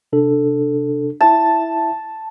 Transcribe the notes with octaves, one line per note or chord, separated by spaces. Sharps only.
C3 D4 A4
E4 E5 A5